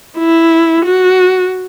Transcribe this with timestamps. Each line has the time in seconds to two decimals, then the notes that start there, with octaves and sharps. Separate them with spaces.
0.18 E4
0.85 F#4